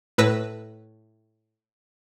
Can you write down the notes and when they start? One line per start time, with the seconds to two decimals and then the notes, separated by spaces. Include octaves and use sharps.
0.18 A2 B4 E6 A#6